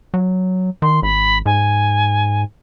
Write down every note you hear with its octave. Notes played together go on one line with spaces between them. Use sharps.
F#3
D#3 C6
G#1 B5
G#2 G#5